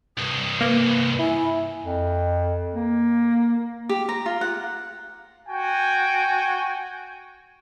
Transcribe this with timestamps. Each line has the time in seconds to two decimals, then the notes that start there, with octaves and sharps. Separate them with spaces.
0.17 C2 G2 D#6
0.61 A#3 B4
1.19 E4 G#5
1.84 F2
2.75 A#3
3.89 G4
4.09 A#5
4.26 F4
4.41 F#5
5.49 F#4 G5 G#5